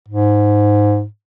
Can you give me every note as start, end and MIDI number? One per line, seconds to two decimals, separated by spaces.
0.08 1.05 44